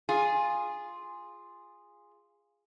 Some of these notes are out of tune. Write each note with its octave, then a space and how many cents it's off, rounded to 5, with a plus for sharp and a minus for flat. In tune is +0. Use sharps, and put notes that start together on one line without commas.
F4 +0 G#4 -10